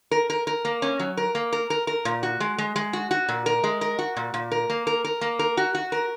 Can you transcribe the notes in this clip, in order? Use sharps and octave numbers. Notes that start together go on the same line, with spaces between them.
A#4
A#4
A#4
A#3
C#4
F#3
A#4
A#3
A#4
A#4
A#4
A#2
F#4
G#3
G#3
G#3
F#4
F#4
A#2
A#4
G#3
A#4
F#4
A#2
A#2
A#4
A#3
A#4
A#4
A#3
A#4
F#4
F#4
A#4